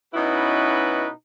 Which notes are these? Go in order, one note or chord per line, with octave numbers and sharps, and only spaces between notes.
B2 C#4 D#4 E4 F#4 B4